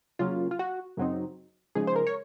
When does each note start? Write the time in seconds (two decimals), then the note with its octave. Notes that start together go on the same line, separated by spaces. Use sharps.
0.19 C#3 F#3 A#3 C#4 F4
0.51 F4
0.59 F#4
0.97 F#2 C#3 F#3 C4 D#4
1.75 C#3 F3 G#3 D#4 G#4
1.87 C5
1.96 A#4
2.07 C#5